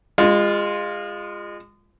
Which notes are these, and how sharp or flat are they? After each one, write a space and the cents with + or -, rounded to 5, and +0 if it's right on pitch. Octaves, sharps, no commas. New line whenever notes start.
G#3 -25 F4 +0